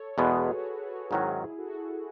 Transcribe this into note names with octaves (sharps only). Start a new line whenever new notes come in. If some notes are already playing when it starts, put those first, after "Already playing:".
Already playing: A4 C#5
E2 B2 G#3 B3 G#4 B4
F#4
F#4
G#2 D#3 F#3 C#4 E4 F#4 G#4
F#4 A4